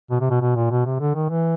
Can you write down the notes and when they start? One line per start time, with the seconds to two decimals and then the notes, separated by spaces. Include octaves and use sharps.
0.11 B2
0.21 C3
0.30 B2
0.41 B2
0.56 A#2
0.70 B2
0.86 C3
1.00 D3
1.15 D#3
1.30 E3